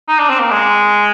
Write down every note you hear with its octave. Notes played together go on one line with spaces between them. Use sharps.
D#4
D4
C4
A#3
G#3